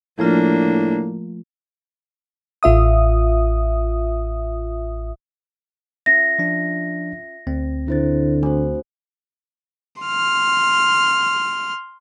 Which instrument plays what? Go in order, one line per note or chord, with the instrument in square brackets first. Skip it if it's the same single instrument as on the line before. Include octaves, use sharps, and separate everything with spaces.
[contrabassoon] A2 [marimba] F3 A3 F4 [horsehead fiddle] A#3 D4
[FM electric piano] A1 F4 E5 D#6
[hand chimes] C#4 F4 E5 [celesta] A#6
[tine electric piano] F3 D4
D2 C4
[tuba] D3 [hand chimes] E4 C5 A6
[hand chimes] A3 F#4 C5 [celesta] D4
[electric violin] C6 F6